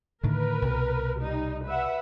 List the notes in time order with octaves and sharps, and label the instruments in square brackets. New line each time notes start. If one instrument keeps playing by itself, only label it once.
[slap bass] A2 D3 D#3 [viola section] A#4 B4
[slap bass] C2 B2
[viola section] G3 D#4
B4 E5 F#5